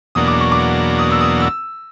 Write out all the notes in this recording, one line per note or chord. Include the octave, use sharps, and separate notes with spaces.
E2 B2 F#3 A#3 D4 D#6
D6
C#6
D6
D#6
E6
D#6
E6